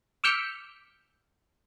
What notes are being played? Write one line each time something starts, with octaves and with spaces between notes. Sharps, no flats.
D6 E6 F6 G6 B6 C#7